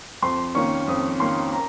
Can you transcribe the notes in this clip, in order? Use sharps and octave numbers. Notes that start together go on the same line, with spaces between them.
F2 C6
D#3 A#3 C#4 C#6
F2 D#6
D#3 A#3 C#4 C6
A#5